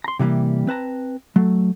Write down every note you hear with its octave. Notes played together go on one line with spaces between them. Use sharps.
A#5 C6
C3 E3 F#3 G3 A#3
C4 B4 A5 A#5
F#3 A3